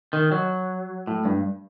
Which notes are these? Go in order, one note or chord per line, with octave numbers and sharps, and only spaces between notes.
D#3
F#3
A2
G2